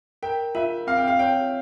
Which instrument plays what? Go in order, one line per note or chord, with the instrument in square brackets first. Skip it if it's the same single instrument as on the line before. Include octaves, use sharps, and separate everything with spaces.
[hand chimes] A#4 [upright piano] G5
[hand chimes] F4 [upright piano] E5
[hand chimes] C4 [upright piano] F5
[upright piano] G5
F5
[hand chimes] C#5 [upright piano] G5